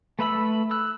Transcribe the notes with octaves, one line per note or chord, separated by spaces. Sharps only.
A3 B4 E5 B5 E6
E6 F#6